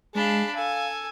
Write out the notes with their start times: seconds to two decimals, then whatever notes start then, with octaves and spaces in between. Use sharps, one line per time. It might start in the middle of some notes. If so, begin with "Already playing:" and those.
0.15 G#3 D4 G#4 F5 A5 B5
0.55 A4 F5 G#5 E6